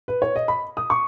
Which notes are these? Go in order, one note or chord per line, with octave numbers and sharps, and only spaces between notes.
B4
C#5
D#5
B5
D#6
C#6